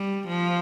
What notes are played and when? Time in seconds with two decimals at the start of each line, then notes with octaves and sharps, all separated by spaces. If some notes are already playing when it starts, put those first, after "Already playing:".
Already playing: G3
0.27 F3